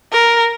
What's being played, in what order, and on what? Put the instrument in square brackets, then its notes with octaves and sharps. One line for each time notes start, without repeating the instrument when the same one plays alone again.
[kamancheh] A#4